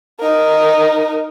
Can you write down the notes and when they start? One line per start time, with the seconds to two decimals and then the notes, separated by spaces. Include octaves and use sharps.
0.20 D#4 A#4